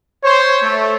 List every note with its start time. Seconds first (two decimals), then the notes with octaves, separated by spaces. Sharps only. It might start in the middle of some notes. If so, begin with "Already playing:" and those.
0.24 C5 C#5
0.61 A3